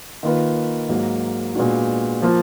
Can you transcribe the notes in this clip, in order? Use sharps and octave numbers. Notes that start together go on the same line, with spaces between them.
D#3 A#3 F4 B4
G#2 F#3 A#3
A#2 G#3 B3 D4 F#4
F3 A#3 F4